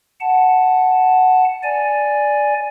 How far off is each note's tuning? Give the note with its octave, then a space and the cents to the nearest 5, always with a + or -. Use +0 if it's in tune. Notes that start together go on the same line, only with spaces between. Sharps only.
F#5 +0 A5 +0
D5 +0 G#5 +0